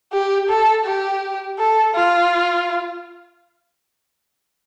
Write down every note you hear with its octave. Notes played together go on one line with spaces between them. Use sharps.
G4
A4
G4
A4
F4